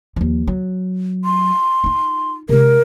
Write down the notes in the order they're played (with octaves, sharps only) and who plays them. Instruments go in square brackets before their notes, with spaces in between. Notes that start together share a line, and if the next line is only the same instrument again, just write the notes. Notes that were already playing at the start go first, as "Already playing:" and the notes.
[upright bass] D#2 F3
F#3
[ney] C6
[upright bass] D#4 F4
[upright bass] C3 G#3 [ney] A#4